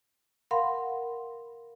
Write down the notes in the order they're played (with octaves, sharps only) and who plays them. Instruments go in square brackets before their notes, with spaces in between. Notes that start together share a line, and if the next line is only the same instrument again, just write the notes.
[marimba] A#4 F5 F#5 B5 C6